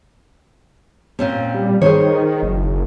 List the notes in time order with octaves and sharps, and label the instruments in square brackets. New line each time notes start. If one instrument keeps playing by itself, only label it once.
[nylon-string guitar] A#2 C4 C#4
[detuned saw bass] G3
[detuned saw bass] D#3 [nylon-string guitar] G#4 C5 C#5
[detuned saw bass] F#1